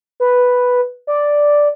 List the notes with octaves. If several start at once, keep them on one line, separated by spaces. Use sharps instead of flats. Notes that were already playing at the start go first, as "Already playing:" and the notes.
B4
D5